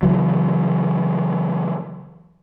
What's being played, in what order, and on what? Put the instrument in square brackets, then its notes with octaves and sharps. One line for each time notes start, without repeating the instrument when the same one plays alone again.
[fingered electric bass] C#3 E3 F#3